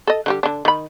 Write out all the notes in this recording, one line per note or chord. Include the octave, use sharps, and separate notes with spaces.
A4 D#5
D3 G3 G4
D3 D4
D#3 B5